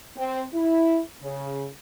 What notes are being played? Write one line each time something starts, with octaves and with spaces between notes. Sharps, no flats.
C4
E4
C#3